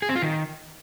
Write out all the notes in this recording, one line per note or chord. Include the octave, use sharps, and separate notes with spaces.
G#4
C4
F4
D#3